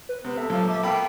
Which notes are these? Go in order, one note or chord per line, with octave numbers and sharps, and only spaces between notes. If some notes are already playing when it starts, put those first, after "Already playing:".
B4
C3 B3 B4
A4 E5
A#2 F3 F#3
A4 E5 D6
B2 A#3 G5 B5